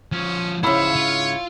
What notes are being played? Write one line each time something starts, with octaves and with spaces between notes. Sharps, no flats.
F3 C#4 C#5
G#2 C#3 E4 C5 C#5 F5 B5 E6
F4 F5